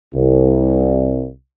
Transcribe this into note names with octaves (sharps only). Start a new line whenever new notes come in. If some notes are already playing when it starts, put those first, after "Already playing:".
C2